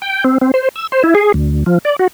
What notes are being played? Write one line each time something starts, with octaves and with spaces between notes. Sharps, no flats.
G5
C4
C4
C5
E6
C5
E4
G#4
D2
F3
D5
F#4